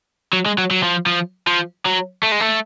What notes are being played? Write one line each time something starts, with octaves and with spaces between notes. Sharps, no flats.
F#3
G#3
F#3
F#3
F3
F3
F3
F#3
A3
G#3
A3